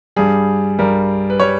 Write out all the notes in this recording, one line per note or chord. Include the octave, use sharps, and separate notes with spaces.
G2 G3 G#4
G2 G3 A#4
B4
G3 C#5